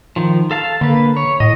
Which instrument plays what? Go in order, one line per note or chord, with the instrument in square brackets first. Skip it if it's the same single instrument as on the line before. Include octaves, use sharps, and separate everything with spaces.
[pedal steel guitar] D#3 F3
A4 F5 A5
[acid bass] D3 [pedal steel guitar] A#3 B4
[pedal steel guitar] C#5
[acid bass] A2 [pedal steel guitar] D#5